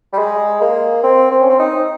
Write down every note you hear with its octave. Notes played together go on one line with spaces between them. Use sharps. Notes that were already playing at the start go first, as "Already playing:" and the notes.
G3
G#3
A#3
C4
C4
C#4
C4
D#4